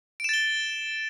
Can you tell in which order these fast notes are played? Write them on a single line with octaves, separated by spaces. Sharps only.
D7 E7 A6 G7